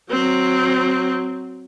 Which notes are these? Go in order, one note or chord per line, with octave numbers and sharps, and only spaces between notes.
F#3 C4